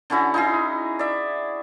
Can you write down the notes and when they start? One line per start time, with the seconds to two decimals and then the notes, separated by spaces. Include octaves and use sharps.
0.10 D3 C#4 E4 F#4
0.34 D#4 E4 G#4
0.99 D5 E5